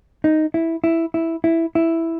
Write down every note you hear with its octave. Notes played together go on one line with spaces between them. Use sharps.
D#4
E4
E4
E4
E4
E4